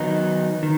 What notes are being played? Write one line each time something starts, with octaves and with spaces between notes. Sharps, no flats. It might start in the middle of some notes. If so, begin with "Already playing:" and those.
Already playing: D#3 F#3 B3 D#4
D#3